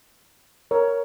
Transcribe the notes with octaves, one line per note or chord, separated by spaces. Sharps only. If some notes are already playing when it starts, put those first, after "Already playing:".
A#4 C#5